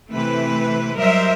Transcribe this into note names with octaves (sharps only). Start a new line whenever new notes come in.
C3 E3 A3 C4 B4
F#3 G3 A#4 C5 D#5 E5